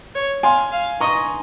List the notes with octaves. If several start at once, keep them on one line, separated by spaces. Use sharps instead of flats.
C#5
F5 G#5 C6
F5
D#5 A#5 C#6